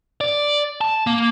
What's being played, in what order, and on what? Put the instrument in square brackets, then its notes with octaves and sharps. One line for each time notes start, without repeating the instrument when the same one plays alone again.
[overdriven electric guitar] D5
A5
A#3